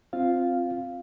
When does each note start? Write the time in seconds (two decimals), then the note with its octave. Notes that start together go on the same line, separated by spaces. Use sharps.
0.13 C4 F4 F5